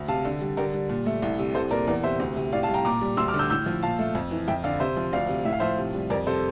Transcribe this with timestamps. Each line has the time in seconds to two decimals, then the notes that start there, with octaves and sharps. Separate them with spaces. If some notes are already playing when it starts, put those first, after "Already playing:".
Already playing: D2
0.08 C3 F5 A5
0.25 D3
0.41 G3
0.57 D3 G4 A#4
0.74 G3
0.89 A#2
1.06 A3
1.22 C2
1.39 C3
1.55 C2 A4 C5
1.71 A#2 A#4 D5
1.87 E2 A#4 D5
2.04 C3 C5 E5
2.20 D2
2.36 C3
2.52 A2 D5 F5
2.63 F5 A5
2.68 G3
2.74 G5 A#5
2.85 A#2 A#5 D6
3.01 G3
3.17 D2 C6 E6
3.28 D6 F6
3.34 D3
3.39 E6 G6
3.50 A2 E6 G6
3.66 F3
3.82 A#2 F5 A5
3.99 A3
4.15 F2
4.31 E3
4.48 F2 E5 G5
4.64 D3 D5 F5
4.80 C3 C5 E5
4.96 F3
5.13 D2 D5 F5
5.29 C3
5.45 A2 E5
5.52 F5
5.60 F3 C5 E5
5.78 C3
5.94 G3
6.10 F2 A#4 D5
6.27 C3 A4 C5